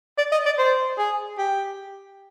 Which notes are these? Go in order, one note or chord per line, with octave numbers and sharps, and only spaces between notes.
D5
D#5
D5
C5
G#4
G4